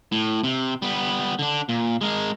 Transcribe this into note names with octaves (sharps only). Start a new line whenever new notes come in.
A2
C3
G3 B3
D3 D4
A#2
G#3 A#4